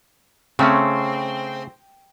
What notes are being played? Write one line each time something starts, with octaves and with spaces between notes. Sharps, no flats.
C#3 A3 C4 C#4